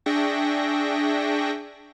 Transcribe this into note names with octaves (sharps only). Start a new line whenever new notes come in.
D4 G#4 E5 G5 C#6 A#6